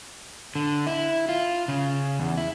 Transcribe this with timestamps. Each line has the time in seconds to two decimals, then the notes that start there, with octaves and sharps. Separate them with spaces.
0.55 D3
0.87 E4
1.29 F4
1.68 C#3
2.20 E2
2.37 E4